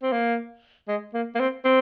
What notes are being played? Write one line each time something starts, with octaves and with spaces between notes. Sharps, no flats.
C4
A#3
G#3
A#3
A#3
C4
C4